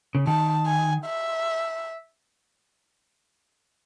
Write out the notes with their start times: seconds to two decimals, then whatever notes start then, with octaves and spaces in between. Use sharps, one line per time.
0.15 C#3
0.27 D#3 A5
0.66 G#5
1.05 E5